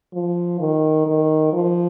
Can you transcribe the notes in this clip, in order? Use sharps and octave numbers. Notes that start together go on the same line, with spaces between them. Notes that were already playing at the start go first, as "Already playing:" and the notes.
F3
D#3
D#3
F3